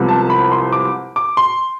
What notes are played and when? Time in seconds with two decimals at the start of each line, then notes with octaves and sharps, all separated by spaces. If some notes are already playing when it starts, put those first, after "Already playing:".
Already playing: C2 C3 F3 G#3 B3
0.09 A5
0.30 B5
0.52 C6
0.73 D6
1.16 D6
1.37 C6